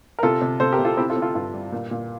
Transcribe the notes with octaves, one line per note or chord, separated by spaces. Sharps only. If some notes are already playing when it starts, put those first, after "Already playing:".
A#4
C3 F4 A4
C3
C3 A4 C5
G4 A#4
C3
F4 A4
C4 E4 G4
F4 A4
C4
F4 A4
G2 F4
G3
A#2
A#2